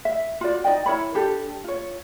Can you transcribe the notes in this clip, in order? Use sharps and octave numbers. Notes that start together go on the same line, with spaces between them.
E5
F4 F#4 D5
D#4 D5 D#5 G5
E4 A#4 C#5 B5
D4 G4 A4
F4 C#5